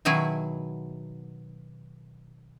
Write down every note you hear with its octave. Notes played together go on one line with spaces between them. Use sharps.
B2 D#3 F#3 E4 G#4